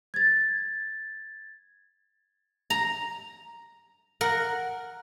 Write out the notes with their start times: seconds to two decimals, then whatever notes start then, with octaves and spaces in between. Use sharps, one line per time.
0.14 G#6 A6
2.70 A#5
4.21 A#4 F#5